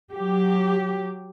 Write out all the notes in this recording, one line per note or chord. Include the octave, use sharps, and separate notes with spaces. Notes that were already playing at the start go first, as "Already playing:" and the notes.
F#3 G4